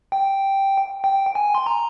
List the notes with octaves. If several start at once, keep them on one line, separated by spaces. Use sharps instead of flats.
G5
G5
G#5
C6
A#5